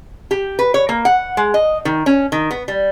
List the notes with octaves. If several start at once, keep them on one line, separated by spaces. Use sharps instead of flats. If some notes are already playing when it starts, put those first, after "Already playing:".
G4
B4
C#5
A#3
F#5
G#3
D#5
D#3
C#4
D#3
B3
G3